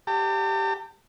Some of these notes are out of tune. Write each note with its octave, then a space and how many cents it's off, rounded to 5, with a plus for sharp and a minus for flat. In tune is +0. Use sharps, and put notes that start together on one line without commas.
G4 +0 A5 +45